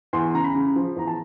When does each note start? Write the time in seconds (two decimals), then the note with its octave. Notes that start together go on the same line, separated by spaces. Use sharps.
0.13 E2 C6
0.34 C#3 A#5
0.44 B5
0.55 C#3
0.76 F3
0.96 E2 A#5
1.07 A5